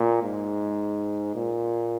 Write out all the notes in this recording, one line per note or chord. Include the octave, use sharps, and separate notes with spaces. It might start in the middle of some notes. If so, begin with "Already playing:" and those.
Already playing: A#2
G#2
A#2